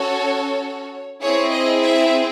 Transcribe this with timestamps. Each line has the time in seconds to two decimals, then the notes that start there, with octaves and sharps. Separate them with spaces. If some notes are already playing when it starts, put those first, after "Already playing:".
Already playing: C#4 F#4 A4 C#5
1.21 C4 E4 G#4 C#5
1.52 D#5
1.82 E5